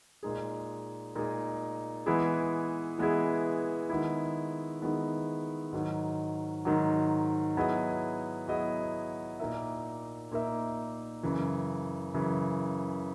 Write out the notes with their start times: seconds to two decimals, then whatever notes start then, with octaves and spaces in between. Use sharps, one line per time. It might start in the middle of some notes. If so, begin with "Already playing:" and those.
0.23 A#2 G#3 D#4 G#4
1.16 A#2 G#3 D#4 G#4
2.06 E3 G#3 B3 E4 G#4
2.98 E3 G#3 B3 E4 G#4
3.89 D#3 G#3 B3 E4
4.82 D#3 G#3 B3 E4
5.73 G#2 D#3 F#3
6.65 G#2 D#3 F#3
7.57 F#3 B3 E4 G#4 D#5
8.48 F#3 B3 E4 G#4 D#5
9.40 A#2 A#3 D#4 A#4 E5
10.31 A#2 A#3 D#4 A#4 E5
11.23 F#2 C#3 E3
12.14 F#2 C#3 E3